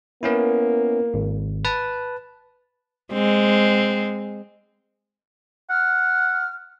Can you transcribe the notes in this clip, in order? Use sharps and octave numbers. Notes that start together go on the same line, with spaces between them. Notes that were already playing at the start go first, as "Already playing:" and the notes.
A#3 B3 C#4 E4
G#1
B4 A5
G#3 C4
F#5 F6